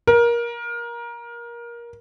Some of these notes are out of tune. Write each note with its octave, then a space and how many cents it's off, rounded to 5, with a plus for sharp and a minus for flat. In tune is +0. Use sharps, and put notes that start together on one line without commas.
A#4 +20